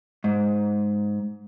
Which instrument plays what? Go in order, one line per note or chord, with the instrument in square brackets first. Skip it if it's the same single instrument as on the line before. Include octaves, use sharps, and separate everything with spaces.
[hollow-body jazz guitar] G#2